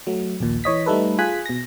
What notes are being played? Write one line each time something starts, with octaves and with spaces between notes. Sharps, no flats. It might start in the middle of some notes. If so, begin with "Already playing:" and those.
F#3 A3
A#1 D#2 A#2
E3 C#5 D#5 B6
G3 A3 D#4 A4 B4
F4 G#4 G#5 F#6 B6
B2 A#6